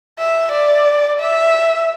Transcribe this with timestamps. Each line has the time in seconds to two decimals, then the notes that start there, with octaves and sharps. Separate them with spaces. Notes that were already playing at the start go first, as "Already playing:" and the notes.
0.19 E5
0.52 D5
1.20 E5